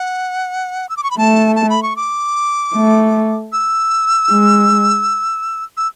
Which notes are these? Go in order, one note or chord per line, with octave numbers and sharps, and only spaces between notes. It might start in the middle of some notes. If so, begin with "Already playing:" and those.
Already playing: F#5
E6
D6
C#6
B5
A3 A5
A5
B5
C#6
D6
A3
E6
G#3
E6